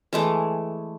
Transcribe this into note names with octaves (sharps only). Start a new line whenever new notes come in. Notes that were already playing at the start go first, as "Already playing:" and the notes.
E3 G#3 A3